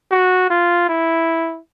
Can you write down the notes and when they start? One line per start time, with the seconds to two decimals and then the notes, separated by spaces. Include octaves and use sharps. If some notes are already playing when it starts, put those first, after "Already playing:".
0.11 F#4
0.50 F4
0.89 E4